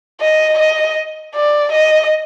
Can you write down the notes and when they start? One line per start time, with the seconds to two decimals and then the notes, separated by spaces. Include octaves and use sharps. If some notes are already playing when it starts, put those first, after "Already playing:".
0.21 D#5
0.59 D#5
1.35 D5
1.72 D#5